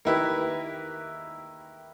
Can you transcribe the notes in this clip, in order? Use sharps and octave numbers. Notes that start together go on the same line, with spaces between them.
D#3 A#3 E4 G4 B4